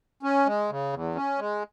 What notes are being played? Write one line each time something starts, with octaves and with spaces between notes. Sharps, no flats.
C#4
G#3
C#3
E2
C#4
G#3